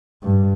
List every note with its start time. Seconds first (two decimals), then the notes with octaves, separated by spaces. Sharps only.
0.23 G2